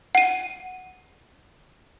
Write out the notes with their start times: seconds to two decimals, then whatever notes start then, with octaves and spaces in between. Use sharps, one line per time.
0.15 F#5 D#7